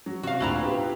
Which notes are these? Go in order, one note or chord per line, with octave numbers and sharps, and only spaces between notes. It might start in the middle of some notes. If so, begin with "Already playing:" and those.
F#3
C3 F#4 F5
D2 A#2 D4 E4 A#5
B3 F4 G4